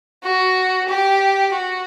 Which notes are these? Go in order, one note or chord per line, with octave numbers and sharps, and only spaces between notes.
F#4
G4
F#4